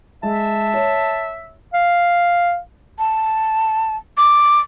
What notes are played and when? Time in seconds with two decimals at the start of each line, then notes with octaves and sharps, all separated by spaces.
0.23 G#3 E5 A5
0.74 C#5
1.74 F5
2.99 A5
4.18 D6